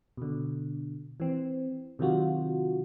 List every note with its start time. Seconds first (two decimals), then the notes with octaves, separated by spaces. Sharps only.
0.17 B2 D3
1.20 E3 C4
1.99 C3 D#3 F#3 F4 F#4